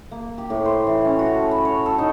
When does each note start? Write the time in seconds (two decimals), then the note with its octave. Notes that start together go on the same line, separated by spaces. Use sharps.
0.11 A#3
0.38 G4
0.50 A2
0.66 C5
0.87 E3
1.05 C#4
1.19 F#4
1.35 A4
1.51 B5
1.65 C#5
1.86 A4
1.98 D#4